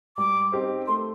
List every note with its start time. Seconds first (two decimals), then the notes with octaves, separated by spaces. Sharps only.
0.17 G3 D6
0.52 C4 D#4 G4 C5
0.87 A3 C6